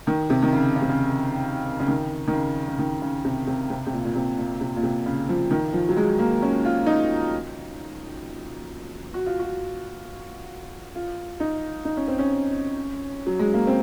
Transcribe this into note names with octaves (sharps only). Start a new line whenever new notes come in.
D#3
C3
D#3
C#3
C#3
C3
C#3
C#3
D#3
D#3
C#3
C#3
D#3
C#3
C3
C3
C3
C3
A#2
A#2
C3
A#2
C3
A#2
C3
C#3
F3
D#3
F3
F#3
G#3
A#3
C#4
F4
D#4
F#4
F4
F#4
F4
D#4
D#4
C#4
C4
C#4
F#3
G#3
A#3
C4